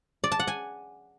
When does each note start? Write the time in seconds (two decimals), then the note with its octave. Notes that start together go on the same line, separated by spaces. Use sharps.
0.24 D5
0.32 A5
0.39 F#5
0.47 G#5